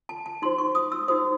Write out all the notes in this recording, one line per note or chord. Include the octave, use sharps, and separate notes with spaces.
A5
A5
D#4 F#4 C5 C6
C#6
D#6
E6
D#4 F#4 C5 D#6